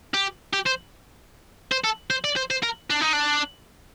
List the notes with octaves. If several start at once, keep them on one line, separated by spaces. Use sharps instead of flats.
G4
G4
C5
C5
A4
C5
D5
C5
C5
A#4
D4
D#4
D4